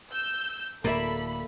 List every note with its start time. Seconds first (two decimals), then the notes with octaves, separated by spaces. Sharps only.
0.12 E6 G6
0.84 D1 A2 A#3 A4 D5 E5 B5